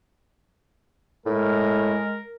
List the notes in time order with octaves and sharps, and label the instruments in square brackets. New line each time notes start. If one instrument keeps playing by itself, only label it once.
[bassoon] A2 [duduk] G#3 [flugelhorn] A#4